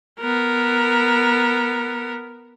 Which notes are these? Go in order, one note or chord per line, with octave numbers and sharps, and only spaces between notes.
B3 A#4